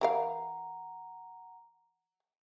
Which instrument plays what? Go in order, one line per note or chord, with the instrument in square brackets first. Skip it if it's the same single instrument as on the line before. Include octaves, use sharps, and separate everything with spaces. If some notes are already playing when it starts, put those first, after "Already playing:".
[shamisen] E3 A#4 F5 [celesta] F#5 A#5